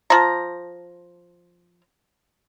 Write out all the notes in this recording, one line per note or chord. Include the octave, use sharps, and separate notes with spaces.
F3 A#5